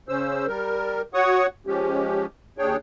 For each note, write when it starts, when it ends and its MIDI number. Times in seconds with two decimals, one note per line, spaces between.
0.09 0.46 49
0.09 0.46 61
0.09 0.46 72
0.09 0.46 88
0.47 1.02 55
0.47 1.02 70
1.14 1.46 66
1.14 1.46 73
1.14 1.46 78
1.14 1.46 85
1.14 1.46 87
1.67 2.26 53
1.67 2.26 56
1.67 2.26 61
1.67 2.26 67
2.58 2.76 39
2.58 2.76 62
2.58 2.76 68
2.58 2.76 73
2.58 2.76 79